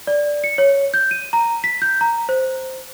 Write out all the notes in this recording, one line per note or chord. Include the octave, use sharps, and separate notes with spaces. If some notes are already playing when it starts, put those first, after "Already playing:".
D5
C#7
C#5
G6
D#7
A#5
B6
G6
A#5
C5